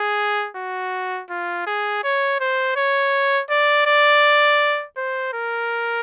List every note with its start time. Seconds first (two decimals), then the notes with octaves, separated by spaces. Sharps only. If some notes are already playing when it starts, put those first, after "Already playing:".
Already playing: G#4
0.56 F#4
1.30 F4
1.67 G#4
2.04 C#5
2.40 C5
2.76 C#5
3.50 D5
3.87 D5
4.97 C5
5.34 A#4